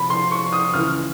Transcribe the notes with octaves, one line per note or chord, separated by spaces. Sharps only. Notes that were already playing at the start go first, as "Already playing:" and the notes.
Already playing: C3 F3 B5
C6
C#6
D#6
C#2 C#3 E3 F6